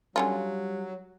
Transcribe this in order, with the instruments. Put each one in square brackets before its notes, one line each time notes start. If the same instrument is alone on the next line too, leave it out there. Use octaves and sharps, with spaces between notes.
[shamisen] D3 C#4 F4 [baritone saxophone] F#3 [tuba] G3